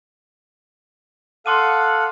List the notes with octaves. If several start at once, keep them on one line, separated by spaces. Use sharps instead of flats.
A4 F5 F#5 C6 D6 D#7